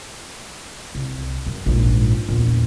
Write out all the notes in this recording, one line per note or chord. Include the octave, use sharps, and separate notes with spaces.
C2
F#2
A#1 G#2
A#1 E2